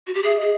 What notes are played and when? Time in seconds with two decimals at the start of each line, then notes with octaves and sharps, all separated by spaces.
0.07 F#4
0.14 G4
0.22 G#4 E5
0.38 G#4 D#5